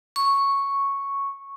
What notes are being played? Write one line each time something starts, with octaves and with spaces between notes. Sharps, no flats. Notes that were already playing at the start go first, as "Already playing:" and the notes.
C#6